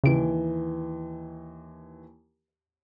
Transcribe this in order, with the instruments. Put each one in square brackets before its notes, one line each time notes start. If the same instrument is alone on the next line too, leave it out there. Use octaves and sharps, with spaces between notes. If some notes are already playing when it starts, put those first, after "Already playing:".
[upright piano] D#2 E3 [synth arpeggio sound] C#3 D7